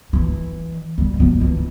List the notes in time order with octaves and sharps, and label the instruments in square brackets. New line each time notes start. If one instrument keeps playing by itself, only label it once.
[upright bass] E3
G3
F3
E3